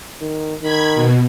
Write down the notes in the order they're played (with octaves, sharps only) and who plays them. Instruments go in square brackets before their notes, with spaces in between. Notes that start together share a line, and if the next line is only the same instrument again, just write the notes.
[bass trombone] D#3
[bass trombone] D#3 [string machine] B5 G#6
[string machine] B2